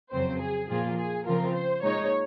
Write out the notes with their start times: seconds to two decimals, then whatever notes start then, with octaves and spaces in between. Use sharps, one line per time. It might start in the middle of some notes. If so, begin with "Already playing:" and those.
0.12 F2 C#3 F#3 C4 C5
0.40 G#4
0.69 A#2 F3 A#3 F4 G#4
0.97 G#4
1.26 C#3 F3 C4 F4 A#4
1.55 C5
1.83 A#2 G#3 D#4 C#5